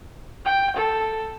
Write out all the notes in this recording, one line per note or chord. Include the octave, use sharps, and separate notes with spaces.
G5
A4